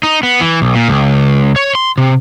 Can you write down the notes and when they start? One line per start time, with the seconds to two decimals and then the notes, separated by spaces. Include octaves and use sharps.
0.03 D#4
0.23 B3
0.41 E3
0.62 B1
0.75 A#2
0.89 C#2
1.56 C#5
1.75 C6
1.98 C3